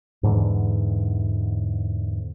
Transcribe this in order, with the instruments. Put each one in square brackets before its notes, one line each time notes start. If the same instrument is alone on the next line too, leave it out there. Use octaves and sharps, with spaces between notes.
[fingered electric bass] E2 G#2 D3 E3